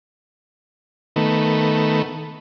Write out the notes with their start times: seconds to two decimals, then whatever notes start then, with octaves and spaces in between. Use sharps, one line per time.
1.16 D#3 A3 B3